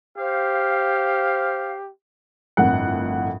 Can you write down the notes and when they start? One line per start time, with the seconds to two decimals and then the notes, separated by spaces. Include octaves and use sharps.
0.18 G4 C5 F5
2.57 G1 F2 A2 A#4 F#5